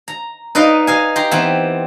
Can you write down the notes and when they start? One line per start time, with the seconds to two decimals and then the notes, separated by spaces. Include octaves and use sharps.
0.08 A#5
0.55 D#4 B4 D5 D#5 F5
0.87 D#5 F5 G#5
1.16 G4 A#5 C6
1.31 E3 B3 C4